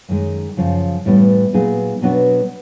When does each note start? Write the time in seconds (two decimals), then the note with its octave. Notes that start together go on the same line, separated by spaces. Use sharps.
0.09 F#2 D#3 G#3
0.57 F#2 C#3 F3
1.05 A2 E3 G3 B3
1.53 A#2 F#3 B3 D#4 G#4
2.02 B2 F#3 B3 D4 F#4